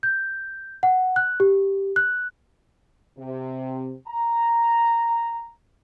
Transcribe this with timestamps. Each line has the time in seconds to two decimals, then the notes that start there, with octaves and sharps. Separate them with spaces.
0.03 G6
0.83 F#5
1.16 F#6
1.40 G4
1.96 F#6
3.17 C3
4.08 A#5